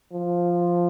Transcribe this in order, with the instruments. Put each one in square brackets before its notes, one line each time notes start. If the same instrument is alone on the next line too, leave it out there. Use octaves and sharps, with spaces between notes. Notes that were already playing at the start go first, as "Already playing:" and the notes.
[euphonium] F3